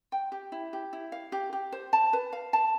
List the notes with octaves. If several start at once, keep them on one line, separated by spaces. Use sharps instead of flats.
G5
G4
E4
G4
E4
F5
G4
G4
C5
A5
B4
F5
A5